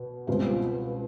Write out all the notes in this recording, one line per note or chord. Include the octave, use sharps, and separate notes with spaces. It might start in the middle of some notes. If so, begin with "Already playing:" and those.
Already playing: B2
C#2 B2 G3 C4 F4